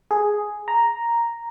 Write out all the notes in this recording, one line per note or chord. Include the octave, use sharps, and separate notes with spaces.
G#4
A#5